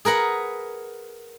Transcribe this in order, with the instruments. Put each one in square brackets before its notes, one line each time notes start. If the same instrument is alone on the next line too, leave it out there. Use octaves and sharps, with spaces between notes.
[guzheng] G#4 A#4 B4 F#5